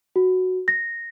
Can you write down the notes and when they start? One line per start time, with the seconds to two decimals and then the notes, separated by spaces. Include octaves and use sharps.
0.16 F#4
0.68 A#6